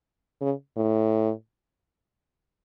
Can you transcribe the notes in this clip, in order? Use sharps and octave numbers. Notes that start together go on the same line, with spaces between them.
C#3
A2